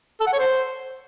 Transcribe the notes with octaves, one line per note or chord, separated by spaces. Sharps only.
A4
F#5
C#5
C5